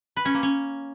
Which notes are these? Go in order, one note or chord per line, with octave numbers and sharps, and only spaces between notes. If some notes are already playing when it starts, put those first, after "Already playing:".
B4
C#4
A#3
C#4